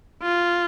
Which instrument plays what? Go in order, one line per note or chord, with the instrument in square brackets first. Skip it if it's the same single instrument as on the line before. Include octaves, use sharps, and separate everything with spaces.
[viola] F4